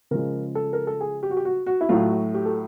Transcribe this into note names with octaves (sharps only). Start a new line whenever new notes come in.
C#3 F3 G#3 A#4
A4
A#4
A4
G#4
G4
F#4
G4
F#4
F#4
E4
A2 F#3 A3 F4
F#4
G4
A4